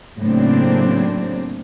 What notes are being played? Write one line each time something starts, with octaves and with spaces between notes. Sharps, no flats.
A2 C#3 F#3 A#3 C4 D4